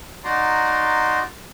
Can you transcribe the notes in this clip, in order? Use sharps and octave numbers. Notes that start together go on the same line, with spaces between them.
D#4 F#4 D5 A#5 C6